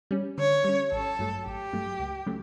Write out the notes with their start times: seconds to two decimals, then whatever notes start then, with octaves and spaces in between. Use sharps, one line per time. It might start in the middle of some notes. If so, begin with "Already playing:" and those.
0.11 G3 C#4
0.38 D3 C#5
0.64 G3 C#4
0.92 A1 A4
1.19 G2 F#3 A3
1.46 A1 G4
1.73 G2 F#3 A3
1.99 C#2
2.26 C#3 F#3 A3